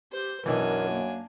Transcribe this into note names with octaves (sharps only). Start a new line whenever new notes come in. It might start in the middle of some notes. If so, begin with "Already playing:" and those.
G4 C5
B1 F#2 E3 D4 A#4 G#5
A#3